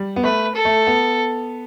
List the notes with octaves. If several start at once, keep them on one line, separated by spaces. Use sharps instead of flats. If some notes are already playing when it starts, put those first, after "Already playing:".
Already playing: G3
B3
A3 B4
A4
A3
B3